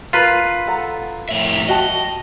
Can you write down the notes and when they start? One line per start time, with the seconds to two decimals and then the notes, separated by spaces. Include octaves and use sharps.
0.13 F4 A#4 B4
0.67 A4 F#5 A#5
1.29 F2 A2 E5
1.68 F#4 D#5 G5 A5